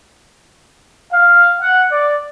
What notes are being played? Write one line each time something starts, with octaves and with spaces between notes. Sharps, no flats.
F5
F#5
D5